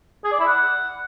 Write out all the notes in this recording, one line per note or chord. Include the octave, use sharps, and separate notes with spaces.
G#4
D5
E4
F#5